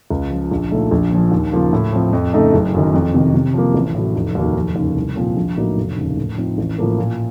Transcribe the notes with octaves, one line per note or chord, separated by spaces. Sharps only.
C#2
C#3 F3
A#1
A#2 A3 D#4
A#1
A#2 F3
D#2
C#3 F3 A#3 F4
A2
F3 C4
F2
C#3 A3 D#4 A4
F#1
F#2 D#3
F2
C3 D#3
C3
F3 A#3
A1
A2 F#3
F1
D#2 D#3 F#3 A#3
F1
D#2 C#3
C2
A#2 F3 C4
A#1
A2 F#3 A#3 D#4
F1
D#2 C#3
A2
F3 C4 D#4
A1
A2 F3 A#3
A#2